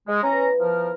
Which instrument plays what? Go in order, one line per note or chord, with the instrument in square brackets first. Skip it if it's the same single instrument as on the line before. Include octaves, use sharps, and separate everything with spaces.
[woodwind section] G#3
[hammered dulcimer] E3 B3 [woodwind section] C#4 A#5
[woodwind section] F3 A#4